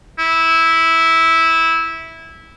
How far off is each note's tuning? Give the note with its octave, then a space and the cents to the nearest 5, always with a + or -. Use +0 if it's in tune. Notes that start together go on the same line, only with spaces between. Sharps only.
E4 -10